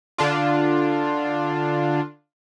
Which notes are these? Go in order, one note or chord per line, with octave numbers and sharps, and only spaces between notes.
D3 D4 F4